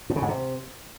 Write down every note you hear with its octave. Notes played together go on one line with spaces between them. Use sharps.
A2
C#3
G#2
C3